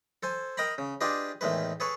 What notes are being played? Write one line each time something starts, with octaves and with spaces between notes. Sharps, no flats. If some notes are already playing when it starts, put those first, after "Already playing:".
A4 C5 G#5
A#4 D#5 G5 A#5 B5
C#3
D4 F4 G4 G#4 B4 D#5
E2 A2 D#3 G#3 B4
G#4 A4 B4 C#5